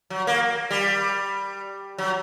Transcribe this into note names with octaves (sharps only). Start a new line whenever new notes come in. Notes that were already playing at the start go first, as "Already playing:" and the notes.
F#3
A#3
G3
F#3